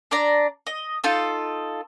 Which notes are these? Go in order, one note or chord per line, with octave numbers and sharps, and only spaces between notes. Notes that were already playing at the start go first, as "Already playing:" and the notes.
D4 D5 A#5
D#5
D#4 F4 A4